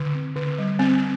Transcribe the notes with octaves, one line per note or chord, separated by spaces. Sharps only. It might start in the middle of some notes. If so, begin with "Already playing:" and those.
Already playing: D3
C4
D3
G3
C4